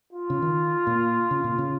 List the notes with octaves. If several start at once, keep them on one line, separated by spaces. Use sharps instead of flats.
F4
C#3
D#3
A#2
C#3
A#2
C#3